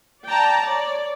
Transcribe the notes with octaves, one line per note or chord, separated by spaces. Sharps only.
D5 G5 A5 A#5
C#5 D5